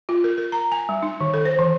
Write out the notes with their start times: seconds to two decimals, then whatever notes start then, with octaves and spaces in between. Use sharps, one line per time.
0.09 F4
0.24 A#4
0.38 A#4
0.52 A#5
0.72 G#5
0.89 G3
1.03 D#4
1.21 D#3
1.34 A4
1.45 C5
1.59 E3